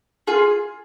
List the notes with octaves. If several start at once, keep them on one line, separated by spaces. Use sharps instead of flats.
F4 G#4